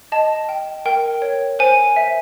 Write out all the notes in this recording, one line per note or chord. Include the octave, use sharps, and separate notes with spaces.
D#5 A5
G5
A#4 G5
C#5
C5 G#5
E5